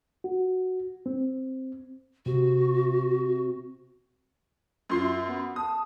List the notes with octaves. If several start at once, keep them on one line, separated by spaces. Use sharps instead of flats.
F#4
C4
C3 F#4
F#2 F4 C6 C7
E5
B3
A5 D#6